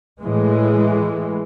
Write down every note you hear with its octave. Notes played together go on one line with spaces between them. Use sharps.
A2 E3 G#3